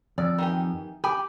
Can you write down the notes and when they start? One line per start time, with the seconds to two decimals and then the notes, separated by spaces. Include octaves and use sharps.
0.18 F2 D5
0.38 D#3 E3 G4
1.04 G4 G5 G#5 B5